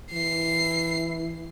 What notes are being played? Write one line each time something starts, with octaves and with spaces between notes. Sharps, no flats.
E3 C7